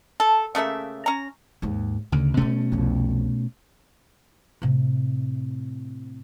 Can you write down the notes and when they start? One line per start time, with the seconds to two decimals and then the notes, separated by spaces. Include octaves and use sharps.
0.20 A4
0.55 C#3 A3 A#3 E5
1.06 C#4 A#5
1.62 D#2 G#2
2.12 D2 C#3
2.37 B2 F#3 G3 A3 C#4
2.72 C2 F2
4.62 A2 C3